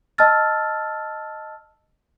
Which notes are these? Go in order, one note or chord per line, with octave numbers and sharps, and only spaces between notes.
D#5 A5 E6 F6 A6